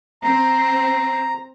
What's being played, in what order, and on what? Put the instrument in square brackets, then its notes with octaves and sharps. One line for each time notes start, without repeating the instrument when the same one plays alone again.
[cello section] C4 [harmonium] A#5